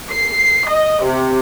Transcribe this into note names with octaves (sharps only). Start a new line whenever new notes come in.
C7
D#5
C3